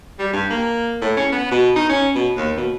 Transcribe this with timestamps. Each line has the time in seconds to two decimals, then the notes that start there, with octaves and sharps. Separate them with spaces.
0.19 G3
0.33 G2
0.51 A#3
1.02 A2
1.17 C#4
1.32 B3
1.51 B2
1.76 D#4
1.90 C#4
2.15 B2
2.37 D#2
2.57 B2